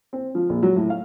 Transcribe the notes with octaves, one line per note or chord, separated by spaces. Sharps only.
C4
F3
A#1
F#3
A2
F5